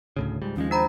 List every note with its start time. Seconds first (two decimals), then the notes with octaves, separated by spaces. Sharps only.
0.16 D2 A2 C#3
0.41 C#2 G#2 G3
0.56 D#2 F3 G#3 C#4
0.71 D4 C5 A#5 B5